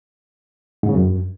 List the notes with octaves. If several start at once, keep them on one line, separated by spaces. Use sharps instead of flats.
G#2
C#3
F#2